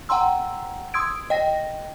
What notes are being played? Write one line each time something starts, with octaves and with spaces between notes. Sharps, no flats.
F#5 G5 A#5 C6 E6
C6 D#6 E6 G#6 D7
D#5 G5 A#6